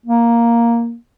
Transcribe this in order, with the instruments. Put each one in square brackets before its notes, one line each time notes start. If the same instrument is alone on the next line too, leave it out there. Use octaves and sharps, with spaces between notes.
[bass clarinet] A#3